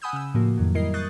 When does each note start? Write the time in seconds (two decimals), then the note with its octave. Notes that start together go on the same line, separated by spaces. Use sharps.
0.02 F#5 G#5 B5 D#6 E6 G6
0.13 C#3 E6
0.34 A2 F3 A#3 F#4
0.58 F2 D#3 F#3
0.75 G3 E4 A#4 D#5 C7
0.94 C#6 D#6 F#6 G6 A6